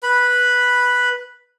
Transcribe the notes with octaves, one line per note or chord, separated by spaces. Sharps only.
B4 B5